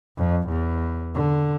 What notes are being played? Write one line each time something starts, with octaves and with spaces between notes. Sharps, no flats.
F2
E2
D3